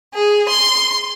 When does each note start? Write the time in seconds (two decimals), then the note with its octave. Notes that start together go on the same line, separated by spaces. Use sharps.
0.13 G#4
0.47 C6